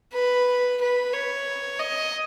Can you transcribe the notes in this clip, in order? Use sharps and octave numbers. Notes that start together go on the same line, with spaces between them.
B4
B4
C#5
D#5